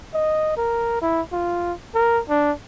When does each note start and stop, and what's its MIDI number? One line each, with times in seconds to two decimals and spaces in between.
0.14 0.56 75
0.57 0.98 70
1.01 1.21 64
1.32 1.73 65
1.95 2.20 70
2.29 2.52 62